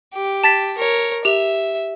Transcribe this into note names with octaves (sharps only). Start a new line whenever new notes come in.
G4
A5 A6 B6
A#4 C#5
G4 E5 F7